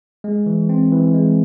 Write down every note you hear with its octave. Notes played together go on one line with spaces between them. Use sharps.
G#3
E3
C4
E3
G#3